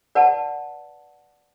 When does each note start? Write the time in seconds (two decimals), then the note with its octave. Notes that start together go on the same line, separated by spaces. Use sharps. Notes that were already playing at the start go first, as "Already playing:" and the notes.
0.15 B4 D5 F#5 A5